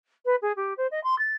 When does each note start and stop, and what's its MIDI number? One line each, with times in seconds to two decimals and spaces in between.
0.25 0.35 71
0.41 0.52 68
0.56 0.73 67
0.77 0.87 72
0.91 1.02 75
1.03 1.17 84
1.18 1.36 93